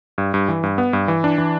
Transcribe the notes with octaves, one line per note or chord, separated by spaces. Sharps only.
G2
G2
E3
G2
B3
G2
E3
D4
E3